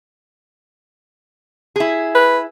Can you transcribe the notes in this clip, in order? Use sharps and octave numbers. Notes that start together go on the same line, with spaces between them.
E4 G#4
B4